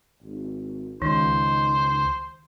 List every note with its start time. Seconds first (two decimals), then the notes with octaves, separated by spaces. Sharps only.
0.22 G#1
1.02 C#2 D#3 D#4 C5